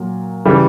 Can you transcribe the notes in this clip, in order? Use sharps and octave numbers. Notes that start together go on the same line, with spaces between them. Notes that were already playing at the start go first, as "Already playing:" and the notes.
Already playing: A#2 F#3
C#3 E3 G3